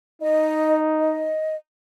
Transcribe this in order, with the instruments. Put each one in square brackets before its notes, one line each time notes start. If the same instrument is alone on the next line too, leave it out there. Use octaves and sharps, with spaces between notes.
[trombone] D#4 [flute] D#5
[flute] D#5